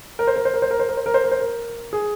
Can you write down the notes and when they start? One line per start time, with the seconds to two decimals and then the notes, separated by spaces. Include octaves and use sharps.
0.19 A#4
0.27 C5
0.36 A#4
0.45 C5
0.54 A#4
0.62 C5
0.71 A#4
0.80 C5
0.89 A#4
0.97 C5
1.06 A#4
1.14 C5
1.24 A#4
1.31 C5
1.40 A#4
1.93 G#4